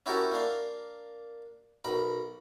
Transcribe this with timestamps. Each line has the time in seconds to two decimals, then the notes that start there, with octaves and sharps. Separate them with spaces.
0.06 C#4 E4 F#4 G4 A4 A#4
0.32 A#3 D4 F5
1.84 B1 A#4 B5